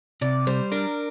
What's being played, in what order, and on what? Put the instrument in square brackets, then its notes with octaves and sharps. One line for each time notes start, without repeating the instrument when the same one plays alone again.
[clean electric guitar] C3 [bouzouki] D5
[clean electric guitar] G3 [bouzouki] C5
[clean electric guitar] D4 [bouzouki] A#4